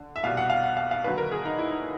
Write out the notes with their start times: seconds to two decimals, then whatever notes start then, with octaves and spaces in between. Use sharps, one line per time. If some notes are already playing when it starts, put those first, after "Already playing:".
Already playing: D3
0.16 E5
0.23 C2 B2 G3 F5
0.37 F#5
0.50 F5
0.64 F#5
0.77 F5
0.91 F5
1.04 D#2 D3 F#3 B4
1.18 A#4
1.32 G#4
1.45 D#4
1.59 E4
1.71 D#4